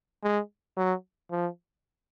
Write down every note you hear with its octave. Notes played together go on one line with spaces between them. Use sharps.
G#3
F#3
F3